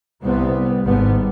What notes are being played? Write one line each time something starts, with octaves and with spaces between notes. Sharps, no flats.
C2 C3 G3 B3
G#1 G#2 G3 B3